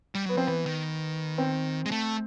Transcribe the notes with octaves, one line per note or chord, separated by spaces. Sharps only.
G3
F#3 B3
F3 C4
E3 B3
D#3
C4
G#3
A3